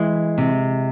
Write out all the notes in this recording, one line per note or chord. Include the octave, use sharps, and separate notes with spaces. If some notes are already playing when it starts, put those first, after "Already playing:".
Already playing: E3 G#3
C3